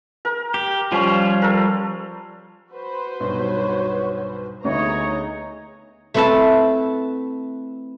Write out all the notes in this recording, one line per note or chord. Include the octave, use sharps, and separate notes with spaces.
A#4
G4
F3 G3 C#4 F4 G#5 B5
A4 A#4
F#4 B4 C5
B1 G2 C#5
D2 B3 D#4 G#4 C#5 D#5 A#5
A3 C4 E4 B4 E5 A5